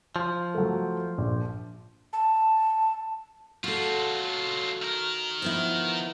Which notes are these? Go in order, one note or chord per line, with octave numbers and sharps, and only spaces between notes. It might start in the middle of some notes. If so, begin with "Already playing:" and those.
F3
F#3 A3
A#1
A5
F#3 F4 F#4 A4
D#3 A#4
F3 B3 E4